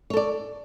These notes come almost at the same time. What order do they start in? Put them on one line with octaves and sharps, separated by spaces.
C#5 A4 D5